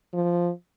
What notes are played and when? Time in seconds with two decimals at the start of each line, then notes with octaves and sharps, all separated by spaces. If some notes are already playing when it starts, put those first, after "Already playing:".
0.13 F3